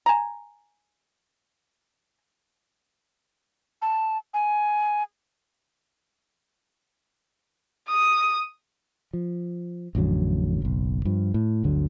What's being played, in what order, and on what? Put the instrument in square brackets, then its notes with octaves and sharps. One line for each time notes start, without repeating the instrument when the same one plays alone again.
[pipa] G#5 A#5
[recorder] A5
G#5
[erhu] D#6
[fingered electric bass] F3
A1 F2 D3 F#3
F#1 B1
G2 F3
A2
G1 D2 D3 F#3